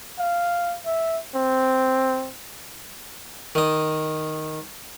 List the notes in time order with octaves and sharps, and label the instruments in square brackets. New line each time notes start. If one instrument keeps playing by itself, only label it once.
[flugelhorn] F5
E5
C4
[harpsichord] D#3 D#5